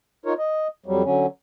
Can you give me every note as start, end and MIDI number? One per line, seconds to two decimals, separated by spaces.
0.26 0.34 63
0.26 0.34 65
0.26 0.34 70
0.26 0.34 73
0.38 0.68 75
0.86 1.03 41
0.86 1.03 54
0.86 1.03 55
1.04 1.26 50
1.04 1.26 54
1.04 1.26 61